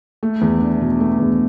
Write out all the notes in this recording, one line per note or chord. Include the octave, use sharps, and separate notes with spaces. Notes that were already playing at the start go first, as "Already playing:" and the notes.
A3
E2
D4
B2
A3
E2